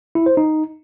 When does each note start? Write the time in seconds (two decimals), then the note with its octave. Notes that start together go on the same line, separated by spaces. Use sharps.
0.15 E4
0.26 C5
0.37 D#4